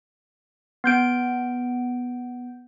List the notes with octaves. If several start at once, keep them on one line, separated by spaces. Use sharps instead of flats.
B3 G6 D7